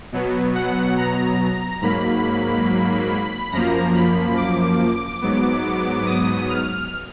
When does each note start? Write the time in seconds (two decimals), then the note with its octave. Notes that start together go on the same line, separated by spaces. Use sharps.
0.12 B2 F#3 B3
0.55 F#5
0.97 A#5
1.82 G#2 F#3 A#3 B5
3.52 F#2 F3 A#3 A#5
3.95 B5
4.37 D6
5.22 G#2 F#3 B3
6.07 D#6
6.50 F6